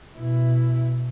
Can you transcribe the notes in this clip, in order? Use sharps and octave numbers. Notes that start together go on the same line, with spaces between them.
B2 E4